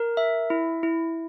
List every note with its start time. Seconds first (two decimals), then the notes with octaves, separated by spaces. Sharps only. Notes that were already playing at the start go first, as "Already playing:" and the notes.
Already playing: A#4
0.17 E5
0.50 E4
0.83 E4